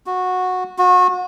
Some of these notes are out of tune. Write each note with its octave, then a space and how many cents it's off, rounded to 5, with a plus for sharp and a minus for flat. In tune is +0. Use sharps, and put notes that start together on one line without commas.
F#4 -15
F#4 -30